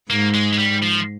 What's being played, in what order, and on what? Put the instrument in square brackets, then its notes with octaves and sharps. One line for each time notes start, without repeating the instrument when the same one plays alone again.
[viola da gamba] G#2 [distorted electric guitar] A#3
[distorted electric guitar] G#3
G#3
G3
F3